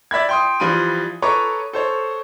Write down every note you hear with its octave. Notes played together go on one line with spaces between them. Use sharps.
D5 E5 B5 G#6
G5 C6 D#6
E3 F3 G3 B5 C6 D#7
A4 B4 C#5 A#5 C#6 D6
A4 C5 C#5